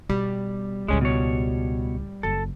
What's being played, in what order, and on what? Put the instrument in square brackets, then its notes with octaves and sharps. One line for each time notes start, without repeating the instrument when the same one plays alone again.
[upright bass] B2 [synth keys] G3
[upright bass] C#2 A2 [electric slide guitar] G#3 C#4
[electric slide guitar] B2 C#5
[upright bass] F#1 F#3 [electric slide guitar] A4